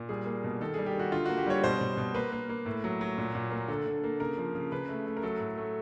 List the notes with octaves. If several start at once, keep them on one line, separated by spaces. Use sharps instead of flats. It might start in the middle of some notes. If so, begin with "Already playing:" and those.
Already playing: A#2
G3 G#4
A#3
B2
D#3 A4
G3 G#4
G4
D#3 F#4
D3 F4
A#3 F#4
G4
G3 C#5
B2 C5
B2
B2
A#3 B4
A#3
A#3
A2
F#3
F#3
A#2
A#2
A#3
D3 A4
D3
A#3
C#3 A#4
F3
C#3
C#3 B4
A3
A3
A#4
F#3 A4
A2
A3